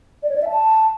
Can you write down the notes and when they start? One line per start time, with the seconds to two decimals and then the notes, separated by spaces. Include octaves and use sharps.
0.23 D5
0.29 C#5
0.36 D5
0.42 E5
0.48 A5